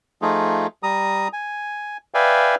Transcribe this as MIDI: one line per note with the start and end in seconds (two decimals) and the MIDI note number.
0.22 0.67 53
0.22 0.67 57
0.22 0.67 63
0.22 0.67 65
0.22 0.67 68
0.83 1.28 55
0.83 1.28 82
0.83 1.28 87
1.33 1.97 80
2.14 2.55 71
2.14 2.55 74
2.14 2.55 76
2.14 2.55 77
2.14 2.55 79
2.14 2.55 80